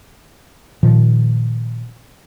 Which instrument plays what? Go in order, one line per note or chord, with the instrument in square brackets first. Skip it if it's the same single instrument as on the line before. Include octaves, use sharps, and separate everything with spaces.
[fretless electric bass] A#2 D#3 F3